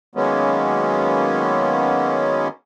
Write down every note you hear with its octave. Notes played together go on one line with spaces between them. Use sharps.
D#3 F#3 G#3 A#3 B3 C#4